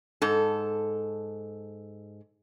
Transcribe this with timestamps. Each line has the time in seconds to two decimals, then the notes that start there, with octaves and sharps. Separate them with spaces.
0.22 G#2 A4